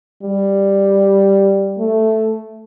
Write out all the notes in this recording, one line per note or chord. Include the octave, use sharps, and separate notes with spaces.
G3
A3